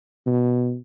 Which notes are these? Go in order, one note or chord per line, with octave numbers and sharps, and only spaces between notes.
B2